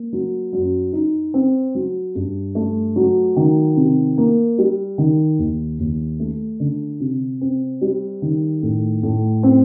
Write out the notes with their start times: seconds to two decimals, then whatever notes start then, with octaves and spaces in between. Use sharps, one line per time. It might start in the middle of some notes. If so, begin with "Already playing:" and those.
Already playing: A#3
0.13 F#3
0.53 F#2
0.93 D#4
1.34 C4
1.75 F#3
2.15 G2
2.55 A3
2.96 F#3
3.36 D#3
3.76 C3
4.18 A#3
4.58 G3
4.98 D#3
5.39 D#2
5.80 D#2
6.20 A3
6.60 D3
7.00 C3
7.41 C4
7.81 G3
8.22 D#3
8.63 A2
9.03 A2
9.43 C4